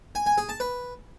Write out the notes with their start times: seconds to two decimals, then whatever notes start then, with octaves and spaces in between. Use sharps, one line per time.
0.15 G#5
0.26 G#5
0.38 G#4
0.49 A5
0.60 B4